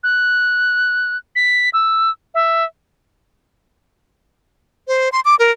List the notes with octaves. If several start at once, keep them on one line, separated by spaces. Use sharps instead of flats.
F#6
B6
E6
E5
C5
C6
D6
A#4